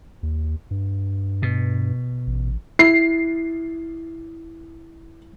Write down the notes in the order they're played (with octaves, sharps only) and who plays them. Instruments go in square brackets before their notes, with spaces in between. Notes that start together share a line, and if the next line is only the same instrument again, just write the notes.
[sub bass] D#2
G2
[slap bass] B2
[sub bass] A1
[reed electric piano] E4 [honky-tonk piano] C7